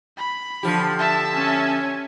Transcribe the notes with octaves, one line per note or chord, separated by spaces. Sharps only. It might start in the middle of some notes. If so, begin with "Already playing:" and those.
B5
D3 F3 G4
E5 A5
C#4 G#5